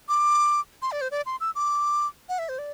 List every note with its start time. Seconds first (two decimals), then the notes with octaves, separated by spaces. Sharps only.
0.09 D6
0.82 C6
0.92 D5
1.01 C5
1.11 D5
1.26 C6
1.40 E6
1.55 D6
2.29 F#5
2.39 E5
2.49 C5
2.59 D5